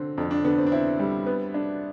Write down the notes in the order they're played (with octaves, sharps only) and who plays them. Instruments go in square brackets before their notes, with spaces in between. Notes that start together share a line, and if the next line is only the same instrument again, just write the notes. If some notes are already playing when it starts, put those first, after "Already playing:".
Already playing: [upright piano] D3 C4
[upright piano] F2 [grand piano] D4
[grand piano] D4
[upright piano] D3 [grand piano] B3
[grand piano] C4
D4
[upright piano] C4 [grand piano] E4
[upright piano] G3
B3
D4